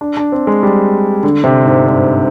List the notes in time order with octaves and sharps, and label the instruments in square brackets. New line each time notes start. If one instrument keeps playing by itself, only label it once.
[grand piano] D4
D4
C4
G#3
G3
D3
C3
G#2
G2